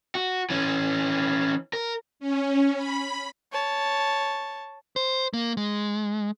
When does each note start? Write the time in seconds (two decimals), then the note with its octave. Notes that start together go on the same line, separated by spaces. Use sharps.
0.15 F#4
0.50 E3 C#4
1.73 A#4
2.20 C#4
2.76 B5
3.52 C#5 A5
4.96 C5
5.33 A#3
5.57 G#3